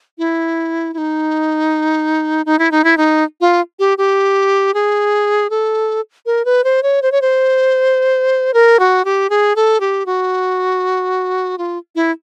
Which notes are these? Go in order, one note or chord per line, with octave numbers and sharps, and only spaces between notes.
E4
E4
D#4
D#4
E4
D#4
E4
D#4
F4
G4
G4
G#4
A4
A#4
B4
C5
C#5
C5
C#5
C5
A#4
F#4
G4
G#4
A4
G4
F#4
F4
E4